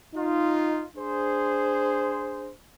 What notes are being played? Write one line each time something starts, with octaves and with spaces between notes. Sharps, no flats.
D#4 F4
D4 G#4 C5